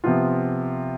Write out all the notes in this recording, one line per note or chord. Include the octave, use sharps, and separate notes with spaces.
C3 F3 B3 F4